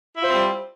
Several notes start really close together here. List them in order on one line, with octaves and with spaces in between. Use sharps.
E4 F4 C5 C4 G3